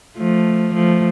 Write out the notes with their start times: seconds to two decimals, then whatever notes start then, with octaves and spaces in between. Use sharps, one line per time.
0.17 F3 A3
0.74 F3 A3